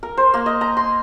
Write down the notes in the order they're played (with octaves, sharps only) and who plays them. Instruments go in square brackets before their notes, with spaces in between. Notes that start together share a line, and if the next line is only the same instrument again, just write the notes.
[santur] A#4
C5
A#3
D#5
A#5
C6